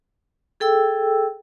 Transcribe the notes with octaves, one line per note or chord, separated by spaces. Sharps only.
G#4 A4 G5 E6